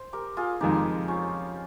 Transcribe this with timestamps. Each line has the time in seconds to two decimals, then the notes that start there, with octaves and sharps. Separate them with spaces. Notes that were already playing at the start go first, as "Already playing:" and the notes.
Already playing: C5
0.13 G4 A#4
0.37 F4 G#4
0.61 F2 D#3 G#3 D#4 G4
1.08 C#4 F4